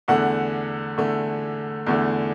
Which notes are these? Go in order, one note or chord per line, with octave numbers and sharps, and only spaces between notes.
E2 D3 A3 F#5
E2 D3 A3
E2 D3 A3